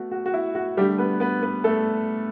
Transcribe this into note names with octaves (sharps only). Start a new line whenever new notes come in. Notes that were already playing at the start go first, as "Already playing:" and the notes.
Already playing: A3 B3 F#4
F#4
F#4
E4
F#4
D3 G3 A3 G4
B3 B4
B3 B4
B3 B4
A3 A4